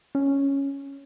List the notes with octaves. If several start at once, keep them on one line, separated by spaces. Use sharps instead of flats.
C#4